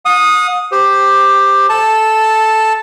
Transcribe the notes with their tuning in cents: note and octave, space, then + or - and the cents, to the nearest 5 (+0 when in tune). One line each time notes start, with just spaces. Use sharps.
F#5 -45 D#6 +0
G4 +10 C5 +0
A4 -10 A5 +0